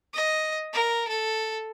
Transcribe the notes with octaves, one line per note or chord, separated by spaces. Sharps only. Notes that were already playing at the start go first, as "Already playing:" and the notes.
D#5
A#4
A4